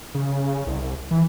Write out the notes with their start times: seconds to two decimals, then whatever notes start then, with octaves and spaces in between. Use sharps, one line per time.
0.15 C#3
0.67 C2
1.11 E3